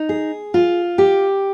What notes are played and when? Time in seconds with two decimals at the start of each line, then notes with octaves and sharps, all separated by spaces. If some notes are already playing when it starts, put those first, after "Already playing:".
Already playing: D#4
0.09 G#4
0.54 F4
0.98 G4